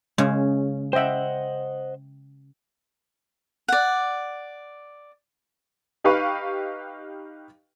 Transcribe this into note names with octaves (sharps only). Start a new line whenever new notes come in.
C#3 G#3 C#4
C5 D#5 E5 F#5 G5
D5 F#5
D#4 G4 B4 F5 C#6